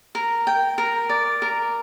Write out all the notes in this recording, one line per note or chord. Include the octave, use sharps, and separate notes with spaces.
A#4
G5
A#4
D5
A#4